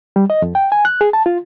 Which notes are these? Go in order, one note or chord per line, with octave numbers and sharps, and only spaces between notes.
G3
D#5
F2
G5
G#5
F#6
G#4
A5
F4